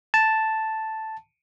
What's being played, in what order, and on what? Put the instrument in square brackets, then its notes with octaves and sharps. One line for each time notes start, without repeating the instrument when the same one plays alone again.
[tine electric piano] A5